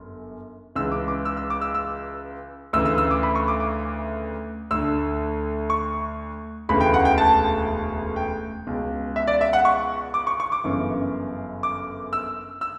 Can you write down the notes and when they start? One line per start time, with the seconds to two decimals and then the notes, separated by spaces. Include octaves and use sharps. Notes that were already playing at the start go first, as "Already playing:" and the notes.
Already playing: G1 F#2
0.76 C#2 C#3 E3 E6
0.92 D6
1.08 D6
1.25 E6
1.37 E6
1.50 D6
1.61 E6
1.75 E6
2.73 D2 C#3 E3 E6
2.86 E6
2.98 E6
3.11 D6
3.23 B5
3.35 C#6
3.48 D6
3.60 D6
4.71 D2 D3 E6
5.70 C#6
6.69 E1 D2 C#3 E3 B5
6.81 G5
6.94 F#5
7.05 G5
7.18 A5
8.16 G5
8.67 C#2 B2
9.16 E5
9.27 D5
9.41 E5
9.53 F#5
9.65 C#6
10.14 D6
10.27 C#6
10.40 C#6
10.52 D6
10.64 G1 F#2 C#3 E3
11.63 D6
12.13 E6
12.61 E6